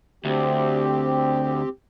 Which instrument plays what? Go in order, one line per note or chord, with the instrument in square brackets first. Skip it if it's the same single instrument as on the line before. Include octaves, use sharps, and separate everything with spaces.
[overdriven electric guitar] D2 [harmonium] C4 G4